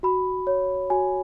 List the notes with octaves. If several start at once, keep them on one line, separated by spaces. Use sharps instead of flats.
F#4 B5
C#5
F#4 G#5